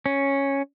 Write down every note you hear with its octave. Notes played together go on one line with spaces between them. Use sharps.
C#4